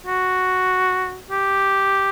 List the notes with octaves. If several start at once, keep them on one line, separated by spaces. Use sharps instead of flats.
F#4
G4